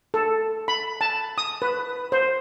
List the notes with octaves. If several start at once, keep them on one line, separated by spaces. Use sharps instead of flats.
A4
B5
A5
D#6
B4
C5